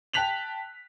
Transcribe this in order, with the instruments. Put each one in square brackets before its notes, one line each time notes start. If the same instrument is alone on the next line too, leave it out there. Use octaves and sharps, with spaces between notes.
[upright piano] G5 A5 F#6 B6 F7 F#7